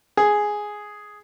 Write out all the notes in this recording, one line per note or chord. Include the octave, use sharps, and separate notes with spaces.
G#4